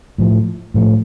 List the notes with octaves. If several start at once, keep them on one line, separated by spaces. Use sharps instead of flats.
A2 F3 A3
A2 F3 A3